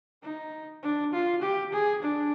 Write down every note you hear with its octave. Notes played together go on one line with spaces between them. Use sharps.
D#4
D4
F4
G4
G#4
D4